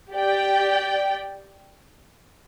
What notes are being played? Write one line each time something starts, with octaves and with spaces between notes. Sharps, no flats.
G4 D5 G5